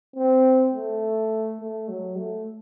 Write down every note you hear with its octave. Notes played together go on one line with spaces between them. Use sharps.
C4
A3
A3
F#3
A3